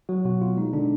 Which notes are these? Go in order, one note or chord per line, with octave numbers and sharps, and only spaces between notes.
F#3 F#4
B2 F#4
B2 F4
G#3 D#4
D3 D4